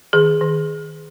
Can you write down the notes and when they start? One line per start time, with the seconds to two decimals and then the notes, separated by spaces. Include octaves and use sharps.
0.13 D#3 G#4
0.41 D#3